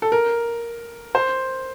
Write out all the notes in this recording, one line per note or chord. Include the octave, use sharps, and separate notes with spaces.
A4
A#4
C5